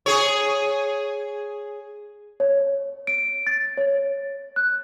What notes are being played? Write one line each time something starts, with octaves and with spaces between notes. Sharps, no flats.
G#4 C#5
C#5
D7
A6
C#5
F#6